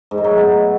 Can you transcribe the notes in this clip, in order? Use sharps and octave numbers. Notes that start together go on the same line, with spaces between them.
G#2
D#3
F#3
A2
B2